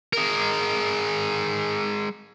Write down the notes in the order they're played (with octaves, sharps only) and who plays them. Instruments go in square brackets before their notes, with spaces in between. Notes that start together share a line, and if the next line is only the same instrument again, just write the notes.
[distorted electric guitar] G#3 A#4